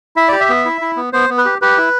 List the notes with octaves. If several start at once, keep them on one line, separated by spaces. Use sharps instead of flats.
E4 E5
G4 D5
E5
B3
E4
E4
B3
B3 C5
B3
B4
G4
G4 B4
E4